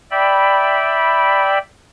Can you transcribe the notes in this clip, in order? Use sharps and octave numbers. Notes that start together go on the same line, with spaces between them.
D5 E5 G5 B5